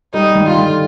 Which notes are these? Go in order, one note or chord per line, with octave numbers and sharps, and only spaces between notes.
G3 D#4
D#3
F4
D3